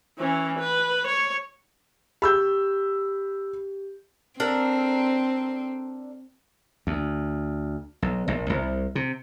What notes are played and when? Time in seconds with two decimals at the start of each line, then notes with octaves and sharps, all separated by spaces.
0.19 E3 C#4
0.59 B4
1.08 C#5
2.22 G4 B5 E6 G6
4.40 C4 D4 A4 A#4
6.87 D2
8.02 B1
8.28 A#1
8.50 C2
8.95 C3